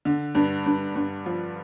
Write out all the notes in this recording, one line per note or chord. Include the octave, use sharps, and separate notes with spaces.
D3
G2
G2
G2
F3